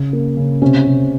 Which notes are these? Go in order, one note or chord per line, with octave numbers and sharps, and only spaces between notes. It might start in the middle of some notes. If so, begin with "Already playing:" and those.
Already playing: C#3
A#3
C#3
C3 C#4
C3